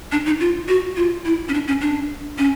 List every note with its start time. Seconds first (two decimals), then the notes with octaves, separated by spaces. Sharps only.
0.12 D4
0.26 D#4
0.40 F4
0.68 F#4
0.97 F4
1.25 E4
1.49 C#4
1.54 D4
1.67 C#4
1.81 D4
2.38 C#4